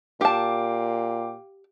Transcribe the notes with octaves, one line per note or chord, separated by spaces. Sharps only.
A#2 G4 F5 G5 A5 D6